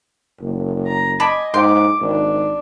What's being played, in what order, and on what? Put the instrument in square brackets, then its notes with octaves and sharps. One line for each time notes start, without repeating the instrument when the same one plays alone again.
[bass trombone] F#1
[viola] A#5
[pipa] D5 A5 B5 [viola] D#5 G#5
[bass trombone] G#2 [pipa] G5 C6 [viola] D6
[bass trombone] G#1 [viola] D4